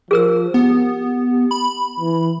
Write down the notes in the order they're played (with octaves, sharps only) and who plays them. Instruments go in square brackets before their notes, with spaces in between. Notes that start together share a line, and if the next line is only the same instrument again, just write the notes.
[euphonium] F3 [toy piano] G#4 A#4 E6
[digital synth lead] B3 [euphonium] G4
[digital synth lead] B5
[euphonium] E3